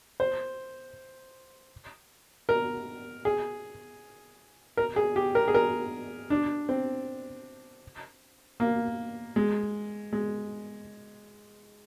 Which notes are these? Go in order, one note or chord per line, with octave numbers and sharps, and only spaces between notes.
C5
A#4
G#4
A#4
G#4
G4
A#4
G#4
A#4
D4
C4
A#3
G#3
G#3